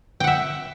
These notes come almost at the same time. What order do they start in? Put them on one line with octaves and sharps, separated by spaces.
G5 F#5 E5